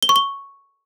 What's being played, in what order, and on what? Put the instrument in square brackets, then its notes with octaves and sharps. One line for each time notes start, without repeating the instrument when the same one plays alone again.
[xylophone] G7
C#6
G7